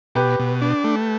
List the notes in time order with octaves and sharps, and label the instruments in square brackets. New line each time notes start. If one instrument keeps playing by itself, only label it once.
[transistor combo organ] B2 [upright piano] G4 B4
[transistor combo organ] B2
D4
A3